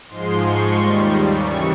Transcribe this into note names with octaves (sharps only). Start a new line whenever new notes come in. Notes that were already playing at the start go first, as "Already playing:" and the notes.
G#2 F3 G#3 C6
C#6
D#2 D#3 G3
D#2 C#3 E3 C#6